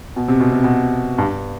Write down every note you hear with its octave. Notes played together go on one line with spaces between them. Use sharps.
B2
C3
B2
C3
B2
G2